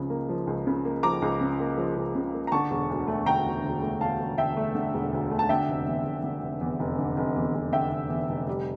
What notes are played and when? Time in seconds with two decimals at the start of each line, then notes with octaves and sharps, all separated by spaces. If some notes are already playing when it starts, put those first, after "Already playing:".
Already playing: C#2 C#3 F3
0.10 A#3
0.29 F3
0.47 C#2
0.67 C#3
0.85 A#3
1.03 F3 A#5 D6
1.22 C#2
1.41 C#3
1.60 A#3
1.78 F3
1.96 C#2
2.15 C#3
2.34 A#3
2.47 A#5
2.52 D3 A5 C#6
2.71 E1
2.90 D2
3.07 A3
3.26 D3 G5 A#5
3.45 E1
3.64 D2
3.82 A3
4.01 D3 F5 A5
4.19 E1
4.38 D2 E5 G5
4.57 A3
4.75 D3
4.94 E1
5.13 D2
5.31 A3
5.39 A5
5.49 D3 E5 G5
5.68 F1
5.87 E2
6.06 F1
6.24 D3
6.42 F1
6.61 E2
6.80 F1
6.99 D3
7.17 F1
7.36 E2
7.54 F1
7.72 D3 E5 G5
7.91 F1
8.10 E2
8.29 F1
8.47 G3